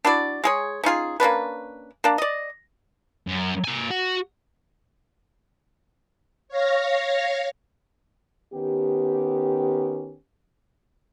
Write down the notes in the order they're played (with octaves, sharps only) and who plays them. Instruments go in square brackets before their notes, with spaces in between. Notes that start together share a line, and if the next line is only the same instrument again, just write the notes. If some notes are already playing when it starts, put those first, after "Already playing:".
[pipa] D4 E4 F#4 D5
G#3 G#4 C#5
C#4 D#4 F4 G#4
A#3 C#4 D4 B4
A#3 D4
D5 D#5
[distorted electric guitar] F#2
A#3 G#5
F#4 F#5
[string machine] C#5 F5 A#6
[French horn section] D#3 B3 C#4 G4